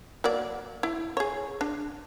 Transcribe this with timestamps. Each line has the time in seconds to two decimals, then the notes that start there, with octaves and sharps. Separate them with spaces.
0.24 F#3 A#3 D5
0.83 E4
1.17 G#4 C#5
1.61 D4